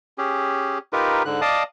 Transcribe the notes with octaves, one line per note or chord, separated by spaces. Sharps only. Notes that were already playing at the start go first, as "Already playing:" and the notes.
C#4 G4 G#4
D#4 F4 G4 A#4 B4
G#2 D3 F#6
D5 D#5 F5 A5 D6 D#6